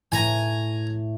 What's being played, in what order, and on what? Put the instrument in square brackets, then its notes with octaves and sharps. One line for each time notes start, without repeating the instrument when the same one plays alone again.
[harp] A2 [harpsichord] G#5 A#5